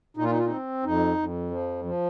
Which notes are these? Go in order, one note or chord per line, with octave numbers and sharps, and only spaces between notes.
A#2 D#4
F4
D#4
F4
C4 D#4
F2 D#4
F2
F3
F3